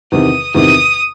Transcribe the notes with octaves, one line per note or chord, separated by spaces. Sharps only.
E2 C3 D#3 D#6
E2 C3 D#3 D#6